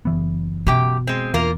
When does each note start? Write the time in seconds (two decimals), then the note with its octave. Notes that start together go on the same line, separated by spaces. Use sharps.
0.05 F#1 E3 B3
0.67 F#2 B2 G4 G5
1.07 G#3 C4
1.34 E2 A#3 F4 A#4